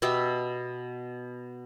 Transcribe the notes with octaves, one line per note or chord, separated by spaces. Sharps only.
B2 B3 G4 E5